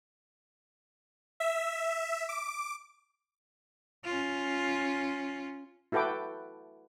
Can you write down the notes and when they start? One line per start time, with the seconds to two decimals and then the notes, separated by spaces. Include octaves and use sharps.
1.40 E5
2.29 D6
4.05 C#4 F4
5.92 E4 F#4 A4 B4 G5 D6